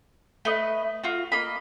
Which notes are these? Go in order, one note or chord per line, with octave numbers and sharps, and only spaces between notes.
A3 B4 D#5
F4 F#4
A#3 D#5 B5